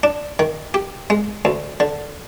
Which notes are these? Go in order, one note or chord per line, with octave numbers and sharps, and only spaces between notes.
D4
D#3
G4
G#3
D2
D3